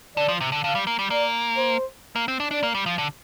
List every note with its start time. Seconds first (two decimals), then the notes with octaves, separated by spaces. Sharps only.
0.16 D3 D5
0.28 F3
0.41 C3
0.52 D3
0.63 D3 F5
0.75 G3
0.87 A#3
0.99 G3
1.10 A#3 D5
1.57 C5
2.16 A#3
2.28 C4
2.40 D4
2.51 D4 D5
2.63 A#3
2.75 G3
2.86 F3
2.98 D3